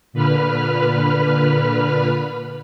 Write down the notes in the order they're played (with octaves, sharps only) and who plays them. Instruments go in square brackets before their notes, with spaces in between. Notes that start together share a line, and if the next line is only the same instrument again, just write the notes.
[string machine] A#2 D3 B4 B5 F6